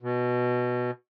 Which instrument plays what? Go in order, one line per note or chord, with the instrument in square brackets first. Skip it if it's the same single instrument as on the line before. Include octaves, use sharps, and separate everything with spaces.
[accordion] B2